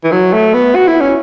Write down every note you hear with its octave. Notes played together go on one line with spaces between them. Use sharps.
E3
F#3
A3
B3
F#4
E4
C#4